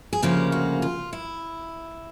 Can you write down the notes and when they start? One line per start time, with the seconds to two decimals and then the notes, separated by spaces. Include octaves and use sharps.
0.13 G#4
0.22 D2 C#3 F3 A#3 G4
0.52 F#4
0.82 F4
1.13 E4